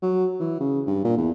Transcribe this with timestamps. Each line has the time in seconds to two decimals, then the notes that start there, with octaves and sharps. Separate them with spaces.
0.02 F#3
0.40 E3
0.60 C#3
0.87 G2
1.04 A#2
1.17 E2